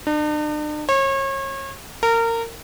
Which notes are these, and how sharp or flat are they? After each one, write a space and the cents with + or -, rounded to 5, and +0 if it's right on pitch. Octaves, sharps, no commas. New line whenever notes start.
D4 +45
C#5 -35
A#4 -25